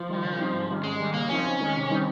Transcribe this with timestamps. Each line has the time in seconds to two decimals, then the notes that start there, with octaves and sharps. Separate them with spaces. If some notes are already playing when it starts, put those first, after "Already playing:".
Already playing: F3
0.08 D#3 G3
0.23 C#3
0.38 G3 C4 D#4
0.53 G#2
0.69 D#3 G3 C#4
0.84 G#2 G#3
0.99 D#3 G3
1.14 C#3 A#3
1.29 F3 C4 C#4 D#4
1.45 F2
1.60 D#3 G#3
1.75 C3
1.89 D#3 G3 C4 D#4